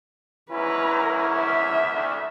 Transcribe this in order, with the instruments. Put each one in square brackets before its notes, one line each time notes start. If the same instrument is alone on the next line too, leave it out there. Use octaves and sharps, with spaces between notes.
[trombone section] E2 G#2 C#4 [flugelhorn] E4 [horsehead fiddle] B4 A#5
[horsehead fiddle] E5
[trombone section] D2